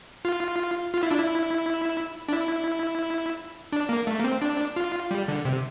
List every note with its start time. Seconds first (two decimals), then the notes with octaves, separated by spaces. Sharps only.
0.25 F4
0.94 F4
1.03 E4
1.11 D4
1.20 E4
2.29 D4
2.33 E4
3.72 D4
3.89 A#3
4.07 A3
4.20 A#3
4.24 C4
4.42 D4
4.76 F4
5.11 G3
5.28 D3
5.45 C3